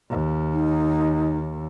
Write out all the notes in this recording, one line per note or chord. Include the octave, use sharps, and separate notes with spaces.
D#2
D#4